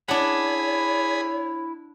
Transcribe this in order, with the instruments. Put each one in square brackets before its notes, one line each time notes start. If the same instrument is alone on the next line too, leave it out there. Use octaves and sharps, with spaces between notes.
[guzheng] D4 F#5 [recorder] E4 [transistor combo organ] G#4 B5 [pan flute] C#5